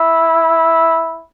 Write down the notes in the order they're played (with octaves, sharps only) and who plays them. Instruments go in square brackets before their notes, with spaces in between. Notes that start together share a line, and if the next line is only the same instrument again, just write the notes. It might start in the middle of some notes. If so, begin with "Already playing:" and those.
Already playing: [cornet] E4